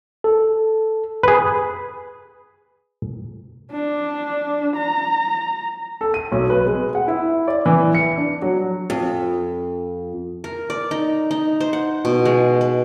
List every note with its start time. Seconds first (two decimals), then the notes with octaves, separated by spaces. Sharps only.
0.24 A4
1.23 G#4 B4
3.71 D4
4.76 A#5
6.01 A4
6.14 D#7
6.32 B1
6.50 B4
6.66 G#3
6.95 F#5
7.08 E4
7.48 D5
7.66 E3
7.95 C#7
8.17 D4
8.42 F#3
8.90 F2
10.44 A#4
10.70 D5
10.91 D#4
11.31 D#4
11.60 C5
11.73 F#5
12.05 B2
12.25 G#3
12.61 B4